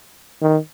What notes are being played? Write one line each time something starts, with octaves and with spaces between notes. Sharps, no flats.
D#3